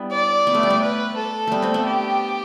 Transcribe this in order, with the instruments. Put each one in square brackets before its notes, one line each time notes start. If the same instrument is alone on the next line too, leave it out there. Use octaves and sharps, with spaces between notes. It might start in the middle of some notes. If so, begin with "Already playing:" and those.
Already playing: [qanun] G3 B3 D4 E4
[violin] D5
[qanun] B3
A3
G3
A3
[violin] B4
A4
[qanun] G3 A3 B3
A3 C4
B3 D4
[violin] G4